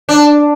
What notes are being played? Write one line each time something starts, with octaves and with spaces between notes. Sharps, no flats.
D4